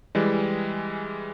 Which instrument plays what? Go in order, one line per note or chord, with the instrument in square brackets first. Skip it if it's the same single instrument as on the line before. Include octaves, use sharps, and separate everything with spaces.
[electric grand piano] E3 G3 G#3